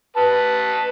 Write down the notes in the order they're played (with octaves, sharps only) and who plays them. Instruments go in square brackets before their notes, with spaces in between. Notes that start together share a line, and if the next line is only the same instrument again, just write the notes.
[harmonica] B4 A5